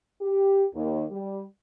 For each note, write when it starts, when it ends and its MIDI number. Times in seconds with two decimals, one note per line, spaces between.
0.21 0.64 67
0.75 1.05 39
1.10 1.43 55